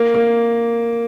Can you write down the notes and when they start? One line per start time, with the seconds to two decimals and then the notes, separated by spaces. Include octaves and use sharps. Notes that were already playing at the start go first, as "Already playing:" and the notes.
Already playing: A#3
0.15 A#3